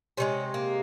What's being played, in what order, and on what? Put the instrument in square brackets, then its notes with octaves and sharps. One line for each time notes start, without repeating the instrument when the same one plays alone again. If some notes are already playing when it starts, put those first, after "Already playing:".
[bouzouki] C3 D#3 G#3 C#4
A#3